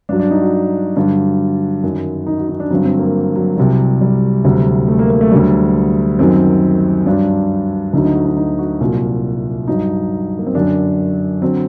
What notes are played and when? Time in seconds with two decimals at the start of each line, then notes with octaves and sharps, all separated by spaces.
0.09 G2 F#3 D4
0.19 D4
0.30 D#4
0.41 F#4
0.96 G2 D3 F#3 F#4
1.83 F#2 D#3 F#3
2.27 D#4
2.38 F#4
2.49 D#4
2.60 D4
2.70 G2 D3 F#3 C4
2.85 C4
2.99 A#3
3.35 F#3
3.57 C2 C3 F#3 G3
4.01 G3
4.45 D2 C3 F#3
4.88 A3
4.99 A#3
5.10 A#3
5.21 A3
5.32 D2 D3 F#3 G3
6.19 F#2 D#3 F#3 C4
7.06 G2 F#3 D4
7.93 D2 D3 F#3 D#4
8.05 D#4
8.15 F#4
8.26 D#4
8.37 D#4
8.59 F#4
8.80 C2 A#2 F#3
9.68 G2 F#3 D#4
10.39 A#3
10.46 C4
10.55 F#2 D3 F#3 D4
11.42 D3 F#3 C4